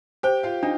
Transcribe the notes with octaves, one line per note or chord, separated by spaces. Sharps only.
G4 C5 G5
F4 F5
D4 D#4